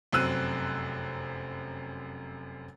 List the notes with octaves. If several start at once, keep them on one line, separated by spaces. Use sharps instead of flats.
F1 F#2 C4 E6 F#6 D#7